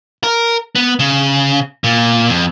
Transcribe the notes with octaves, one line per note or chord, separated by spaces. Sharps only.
A#4
B3
C#3
A#2
F2